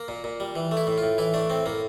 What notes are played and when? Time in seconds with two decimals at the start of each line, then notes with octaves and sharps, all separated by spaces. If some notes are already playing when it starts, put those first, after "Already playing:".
Already playing: A#3
0.08 A#2
0.24 A#2
0.40 G3
0.56 E3
0.71 A3
0.77 E4
0.87 A2
0.98 A2 F4
1.18 E3 E4
1.34 A3 D4
1.50 A2 C4
1.66 A2 A#3